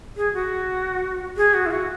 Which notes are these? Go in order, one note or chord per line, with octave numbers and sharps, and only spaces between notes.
G#4
F#4
G#4
F#4
E4
F#4